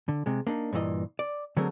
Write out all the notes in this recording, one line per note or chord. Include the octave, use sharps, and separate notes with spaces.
D3
C3 G#3
A#3 D4 D#4
G2 A#2 E3 F4 D#5
D5
D3 F#3 A3 C4 G#4 A#4